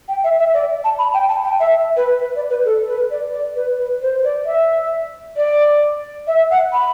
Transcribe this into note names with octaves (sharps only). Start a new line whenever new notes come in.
G5
E5
E5
D5
A5
B5
G5
A5
G5
E5
B4
B4
D5
B4
A4
B4
D5
D5
B4
B4
C5
D5
E5
D5
E5
F#5
B5